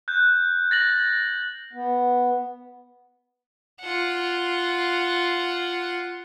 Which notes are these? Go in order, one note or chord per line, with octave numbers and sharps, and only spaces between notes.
F#6 G6
A6 A#6 F#7
B3
F4 F#5